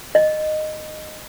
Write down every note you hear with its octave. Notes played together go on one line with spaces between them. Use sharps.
D#5